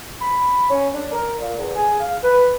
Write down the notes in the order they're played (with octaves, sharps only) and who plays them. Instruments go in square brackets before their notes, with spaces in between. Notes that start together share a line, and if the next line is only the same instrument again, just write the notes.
[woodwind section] B5
C#4
D4
A#4
A#2
E2
G#4
F5
B4